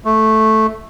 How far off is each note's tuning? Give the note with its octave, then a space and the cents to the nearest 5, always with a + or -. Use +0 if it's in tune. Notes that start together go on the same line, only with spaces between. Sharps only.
A3 -5